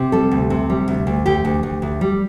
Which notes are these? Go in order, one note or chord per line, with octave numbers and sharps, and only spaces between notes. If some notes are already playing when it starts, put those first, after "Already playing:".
Already playing: C3
G3 A4
D2
C3
G3
D2
D2
D2 G4
D2
D2
D2
G3